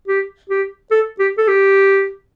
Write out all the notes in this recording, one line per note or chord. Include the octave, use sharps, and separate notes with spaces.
G4
G4
A4
G4
A4
G4